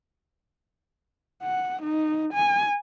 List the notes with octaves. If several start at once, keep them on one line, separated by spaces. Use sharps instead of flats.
F#5
D#4
G#5